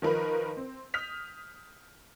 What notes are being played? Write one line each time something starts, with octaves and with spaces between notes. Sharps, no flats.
D#3 F3 A#4 B4 B5
C4
D#6 F6 G6 B6 F7